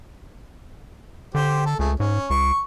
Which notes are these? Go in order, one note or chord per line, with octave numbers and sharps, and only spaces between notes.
D3 G4 C5
A4
C#2 A3 G#4
G#2 C#4
C#2 C#6